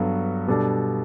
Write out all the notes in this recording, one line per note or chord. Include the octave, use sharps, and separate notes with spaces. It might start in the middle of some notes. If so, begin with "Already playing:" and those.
Already playing: G2 F#3 B3 F#4 A4
B2 G3 D4 A4